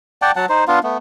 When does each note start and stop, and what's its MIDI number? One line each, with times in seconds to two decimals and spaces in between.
0.22 0.31 74
0.22 0.31 78
0.22 0.31 79
0.22 0.31 81
0.36 0.46 54
0.36 0.46 78
0.36 0.46 81
0.49 0.64 63
0.49 0.64 72
0.68 0.79 59
0.68 0.79 62
0.68 0.79 65
0.68 0.79 77
0.83 0.98 57
0.83 0.98 59